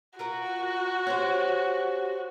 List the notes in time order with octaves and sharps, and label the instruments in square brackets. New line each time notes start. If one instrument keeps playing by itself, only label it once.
[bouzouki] F4 A#4 F#5 [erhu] F#4
[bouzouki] C#4 G4 C5